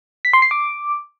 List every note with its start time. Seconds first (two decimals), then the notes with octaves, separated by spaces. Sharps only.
0.25 B6
0.33 C6
0.42 C7
0.51 D6